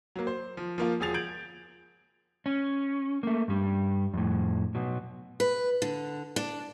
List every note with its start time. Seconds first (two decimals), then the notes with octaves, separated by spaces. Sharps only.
0.16 F#3 A#3
0.27 C5
0.57 F3
0.78 F3 A#3 F4
1.00 E1 F3 G#4 A6 F7
1.14 G6 G#6 D7 F#7
2.46 C#4
3.23 A3 A#3
3.48 G2 G3
4.14 F2 A2
4.75 B2 F#3
5.40 B4
5.82 D3
6.36 D4